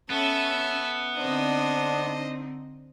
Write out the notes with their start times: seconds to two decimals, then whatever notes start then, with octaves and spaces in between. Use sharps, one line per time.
0.10 B3 C#4 A4 E5
1.17 D3 C4 D4 D#4 C5 D#5